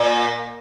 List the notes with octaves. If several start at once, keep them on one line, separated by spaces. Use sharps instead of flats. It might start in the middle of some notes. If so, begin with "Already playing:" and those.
Already playing: A#2